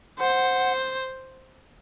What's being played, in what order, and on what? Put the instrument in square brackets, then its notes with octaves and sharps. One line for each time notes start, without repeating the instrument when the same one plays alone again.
[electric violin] C5 [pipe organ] F#5